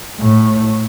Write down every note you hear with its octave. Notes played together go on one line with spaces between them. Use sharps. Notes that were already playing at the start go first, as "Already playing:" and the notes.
A2